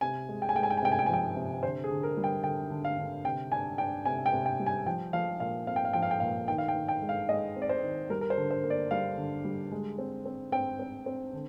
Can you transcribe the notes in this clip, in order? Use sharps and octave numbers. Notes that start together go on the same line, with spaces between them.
C3 G#5
G#3
G5
G#5
G#3 G5
G#5
G5
G#5
C3 G5
G#5
G5
G#5
F3 G5
C3
D3 C5
G#4
D3
A#4
G3
G5
D3 G5
D3
F5
D3
C3 G5
D4 G#5
D4 G5
C3 G#5
G5
C3
G5
G3
G#5
F3 G5
F3 F5
A#2 F5
C4 F5
G5
F5
F3 G5
F5
G5
A#2 F5
D#3 G5
F5
G5
D#3
G5
G#3
F5
G#3 D#5
C4
D5
C5
D#3
G3 A#4
A#4
C5
D3
C5
A#3
D5
G3 F5
D3
G3
G#3
C4
C4
C4 G5
C4
C4
D3